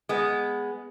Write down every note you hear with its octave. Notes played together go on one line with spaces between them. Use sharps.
G#3 B3